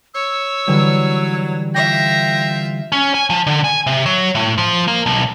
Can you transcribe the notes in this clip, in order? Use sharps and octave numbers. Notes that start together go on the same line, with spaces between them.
C#5 E6
D3 E3 F#3 G3
F4 E5 G5 A#6
C#4
G#5
F3
D3
G#5
C3
F#3
A2
F3
A#3
B1